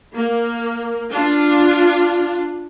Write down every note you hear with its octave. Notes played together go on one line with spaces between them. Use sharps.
A#3
D4 F4